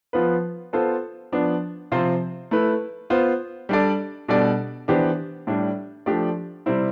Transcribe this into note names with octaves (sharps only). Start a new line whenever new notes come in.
F3 B3 F4 B4
B3 F4 A4 C5
F3 B3 D4
C3 F3 C4 F4 C5
A3 E4 B4
B3 F4 C5
G3 D4 A4 D5
B2 G3 D4 A4 D5
E3 B3 D4 G4 C5
A2 G3 D4
F3 A3 D4 G4 D5
C3 G3 C4 E4